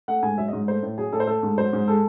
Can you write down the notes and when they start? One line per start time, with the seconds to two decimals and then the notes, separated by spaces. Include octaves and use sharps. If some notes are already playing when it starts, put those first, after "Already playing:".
0.08 A3 F#5
0.23 G#2 G#5
0.38 F#3 E5
0.48 G#2 D#5
0.68 A3 C5
0.83 A2
0.98 F#3 G#4
1.13 A2 A4
1.20 C5
1.27 A3 A4
1.43 G#2
1.58 F#3 C5
1.73 G#2
1.88 G#3 A4